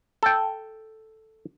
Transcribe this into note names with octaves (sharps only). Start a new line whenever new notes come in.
A4 G5